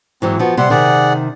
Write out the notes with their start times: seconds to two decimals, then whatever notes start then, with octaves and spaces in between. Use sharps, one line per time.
0.22 G#2 E3 F#3 C4
0.39 F3 B3 F#4
0.57 C3 G3 C4 F#5 C6
0.70 C3 D#3 G#4 D5 F#5